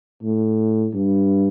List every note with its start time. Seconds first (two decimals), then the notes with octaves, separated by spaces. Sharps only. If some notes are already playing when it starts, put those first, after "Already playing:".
0.22 A2
0.94 G2